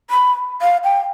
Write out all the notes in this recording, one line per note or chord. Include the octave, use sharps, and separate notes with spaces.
B5
F5
G5